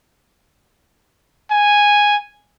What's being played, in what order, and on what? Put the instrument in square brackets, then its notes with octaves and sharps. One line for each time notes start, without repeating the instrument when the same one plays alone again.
[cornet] G#5